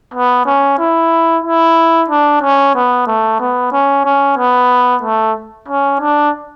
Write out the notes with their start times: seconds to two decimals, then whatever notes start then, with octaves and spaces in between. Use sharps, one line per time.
0.14 B3
0.46 C#4
0.79 E4
1.44 E4
2.10 D4
2.42 C#4
2.75 B3
3.07 A3
3.40 B3
3.72 C#4
4.05 C#4
4.37 B3
5.03 A3
5.68 C#4
6.00 D4